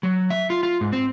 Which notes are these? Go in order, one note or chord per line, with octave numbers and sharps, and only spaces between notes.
F#3
E5
F4
F4
G#2
C4